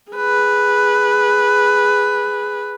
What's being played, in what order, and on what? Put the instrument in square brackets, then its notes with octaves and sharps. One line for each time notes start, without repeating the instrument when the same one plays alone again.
[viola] G#4 B4